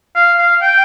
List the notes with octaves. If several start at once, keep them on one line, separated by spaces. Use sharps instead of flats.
F5
F5
G5